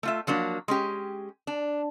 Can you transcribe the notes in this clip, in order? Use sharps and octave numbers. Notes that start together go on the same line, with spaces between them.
A3 F4 E5
F3 F#3 A#3 D4
G#3 C#4 G4
D4